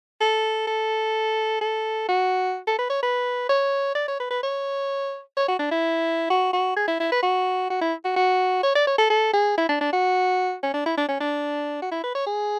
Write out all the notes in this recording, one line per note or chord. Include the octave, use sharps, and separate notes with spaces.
A4
A4
A4
F#4
A4
B4
C#5
B4
C#5
D5
C#5
B4
B4
C#5
C#5
F#4
D4
E4
F#4
F#4
G#4
E4
E4
B4
F#4
F#4
E4
F#4
F#4
C#5
D5
C#5
A4
A4
G#4
E4
D4
D4
F#4
C#4
D4
E4
D4
C#4
D4
F#4
E4
B4
C#5
G#4